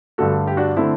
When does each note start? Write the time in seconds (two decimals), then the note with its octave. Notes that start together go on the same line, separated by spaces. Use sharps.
0.18 G2 D3 A3 F#4 A4
0.47 G4
0.57 D4 F#4
0.76 D3 A3 C4 E4